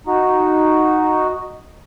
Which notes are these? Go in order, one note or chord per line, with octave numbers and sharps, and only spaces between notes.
D#4 F#4